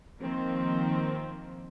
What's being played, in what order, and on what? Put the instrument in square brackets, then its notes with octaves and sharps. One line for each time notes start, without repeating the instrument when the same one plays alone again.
[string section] D#3 F3 A#3 C4